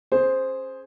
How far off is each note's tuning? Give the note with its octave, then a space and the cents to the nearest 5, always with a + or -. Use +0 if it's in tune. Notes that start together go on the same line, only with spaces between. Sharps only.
C#4 -25 G#4 +0 C5 +0